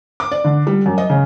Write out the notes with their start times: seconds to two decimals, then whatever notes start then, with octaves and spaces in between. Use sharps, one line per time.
0.20 D6
0.32 D5
0.44 D3
0.67 G3
0.86 F#2
0.98 D#5
1.10 C#3